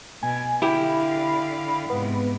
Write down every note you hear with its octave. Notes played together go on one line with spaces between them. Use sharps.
B2 G#5
D3 E4 G4 F5 B5
G#2 C3 B3